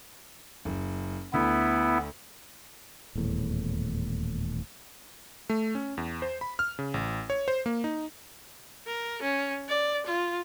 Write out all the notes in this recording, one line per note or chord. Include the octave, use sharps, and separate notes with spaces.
F#1
D2 B3 E4
D#1 E2 A2
A3
C#4
E2
C5
B5
F6
C#3
A1
C#5
C5
A#3
D#4
A#4
C#4
D5
F4